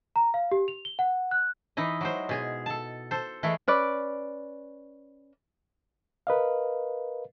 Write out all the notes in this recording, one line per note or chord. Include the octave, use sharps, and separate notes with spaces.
A#5
F5
G4
F7
G7
F#5
F#6
E3 D#4 E4 D#5
F#3 G#3 C5
B2 G#4 G#5
A4 A5
A4 C5
E3 G#3 A3 E4 G#4
C#4 B4 D5
A#4 B4 D#5 F5